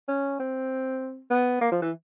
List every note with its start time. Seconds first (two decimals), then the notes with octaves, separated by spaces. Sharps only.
0.08 C#4
0.39 C4
1.30 B3
1.61 A#3
1.72 F3
1.82 E3